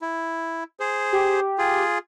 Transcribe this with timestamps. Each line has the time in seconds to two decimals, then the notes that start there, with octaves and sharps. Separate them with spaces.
0.02 E4
0.80 G#4 C5
1.13 G4
1.58 F4 G#4